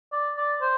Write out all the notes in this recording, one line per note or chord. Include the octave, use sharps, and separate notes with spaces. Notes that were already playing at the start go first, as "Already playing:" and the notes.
D5
D5
C5